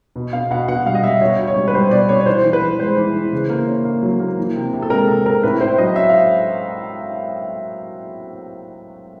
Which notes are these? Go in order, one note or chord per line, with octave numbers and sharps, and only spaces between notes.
B2
B3 F5
B2 F#5
B2 F#5
G3 F5
D#5
G3 E5
B2 C#5
B2
C#5
G3
B4
G3 C5
B2 D5
B3 C#5
C#5
E3 C5
E3
B4
E3
G#3 C5
E3
E3
C#3
A#3
C#4
A#3
F#3
A#3
E3
C3
C3
A4
G#3 A#4
C3 A4
C3 A#4
A2 B4
A2 C5
F#3 D#5
C#4 E5
F5